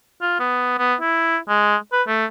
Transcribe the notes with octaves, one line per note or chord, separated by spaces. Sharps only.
F4
B3
B3
E4
G#3
B4
A3